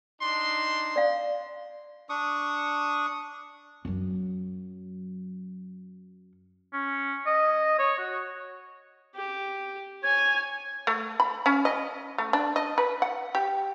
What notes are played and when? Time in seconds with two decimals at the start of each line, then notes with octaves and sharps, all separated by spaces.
0.21 D4 D#4 C6
0.96 D5 F5
2.09 D4 C#6 D#6
3.85 F#2 F#3
6.73 C#4
7.27 D#5
7.79 C#5
7.99 F#4
9.16 G4
10.03 C#5 G#5 G#6
10.87 A3
11.20 B5
11.46 C#4
11.65 D#5
12.18 A3
12.33 D4
12.56 D#5
12.78 B4
13.02 F#5
13.35 G4